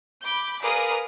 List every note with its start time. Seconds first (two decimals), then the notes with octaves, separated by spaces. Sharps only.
0.22 B5 D6 G6
0.61 G#4 A#4 B4 D5 F5 D#6